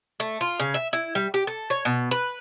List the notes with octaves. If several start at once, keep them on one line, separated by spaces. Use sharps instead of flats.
A3
F4
C#3
E5
E4
G3
G4
A4
C#5
B2
B4